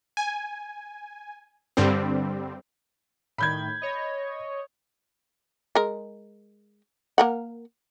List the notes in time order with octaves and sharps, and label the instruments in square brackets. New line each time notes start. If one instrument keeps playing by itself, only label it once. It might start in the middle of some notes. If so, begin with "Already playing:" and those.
[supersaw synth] G#5
G2 D3 G3 C4
[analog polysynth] A2 D#3 [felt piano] B5 G6 G#6
[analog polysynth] C#5 D#5
[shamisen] G#3 A#4
A#3 A#4 F#5